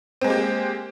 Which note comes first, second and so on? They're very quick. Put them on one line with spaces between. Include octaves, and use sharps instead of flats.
C4 G#3 A#3 G4